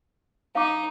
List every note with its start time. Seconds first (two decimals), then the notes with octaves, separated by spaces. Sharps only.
0.55 D#4 F5 D6